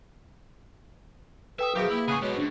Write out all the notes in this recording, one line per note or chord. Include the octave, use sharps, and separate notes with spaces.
A4 B4 E5 G5 D#6
B2 D#3 F3 F#3 G4 G#4 E5 D6
A#3 E4
A2 C#3 B3 G#4 B5 C#6
G#2 B2 G4 C#5
C#2 G#2 D4 C5